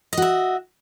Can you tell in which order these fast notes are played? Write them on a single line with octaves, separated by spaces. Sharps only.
D#5 F#4 E5